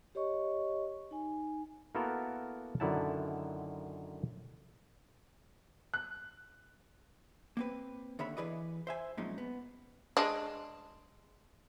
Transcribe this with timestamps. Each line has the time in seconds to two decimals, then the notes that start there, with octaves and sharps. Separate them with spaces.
0.15 G4 C#5 D#5 C#6
1.11 D#4 G#5
1.95 A#3 B3 E4 F#4 A4 A#4
2.80 F#2 D3 D#3 E4 F#5 A5
5.94 F#6
7.57 A#3 C4 B4
8.19 D#2 D3 C#5 E5 B5
8.37 E3 E4 G#4 B4 D5 D#5
8.87 C5 E5 G#5
9.17 F2 A#2 F#3 G#3 C#4 D#4
9.38 B3
10.17 G#3 D4